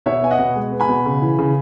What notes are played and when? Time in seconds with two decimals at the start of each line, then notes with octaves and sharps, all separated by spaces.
0.06 B2 C#5 E5
0.22 B3 G#5
0.31 D#5 F#5
0.39 B2
0.56 G#3
0.72 B3
0.80 G#5 B5
0.89 B2
1.06 C#3
1.22 E3
1.39 C#3